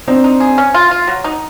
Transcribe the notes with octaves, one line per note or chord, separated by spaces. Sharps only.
C4 D4 D#4
D#4
G#4
C#4
F4
F4
F#3
D#4